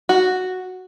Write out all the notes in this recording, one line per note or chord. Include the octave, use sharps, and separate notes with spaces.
F#4